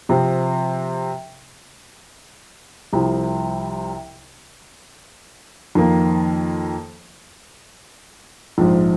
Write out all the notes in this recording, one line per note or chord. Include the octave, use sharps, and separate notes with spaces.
C3 F3 C4
C2 C3 F3
F2 D#3 A#3
A#1 G#2 F3